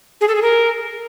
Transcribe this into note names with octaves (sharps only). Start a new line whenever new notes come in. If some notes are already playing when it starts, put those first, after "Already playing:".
G#4
A4
G#4
A#4